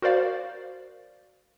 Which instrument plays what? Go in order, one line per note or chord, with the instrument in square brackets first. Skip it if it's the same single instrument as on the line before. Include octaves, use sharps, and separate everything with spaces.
[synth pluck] F#4 A#4 C5 D5 F5